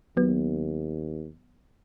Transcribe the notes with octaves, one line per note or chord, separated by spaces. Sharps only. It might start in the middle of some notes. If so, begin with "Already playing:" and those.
D#2 F#3 B3